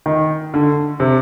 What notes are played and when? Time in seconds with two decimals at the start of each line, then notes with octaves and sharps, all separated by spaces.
0.06 D#3
0.54 D3
1.00 C3